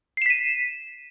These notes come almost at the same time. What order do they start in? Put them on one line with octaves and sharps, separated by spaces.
C7 E7 B6 D#7